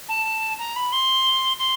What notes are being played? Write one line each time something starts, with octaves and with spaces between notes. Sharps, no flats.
A5
A#5
B5
C6
C6